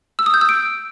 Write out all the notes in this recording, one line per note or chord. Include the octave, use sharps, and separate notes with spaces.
E6
D#6
G6
E6
D7